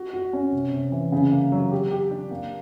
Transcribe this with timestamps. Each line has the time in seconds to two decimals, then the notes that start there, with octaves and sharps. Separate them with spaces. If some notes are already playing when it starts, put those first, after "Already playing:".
Already playing: F#4
0.14 F#4
0.33 C#4
0.52 C3
0.73 C3
0.92 E3
1.12 C#3
1.32 A#3
1.52 F#3
1.71 G4
1.91 G4
2.11 D4
2.31 A#3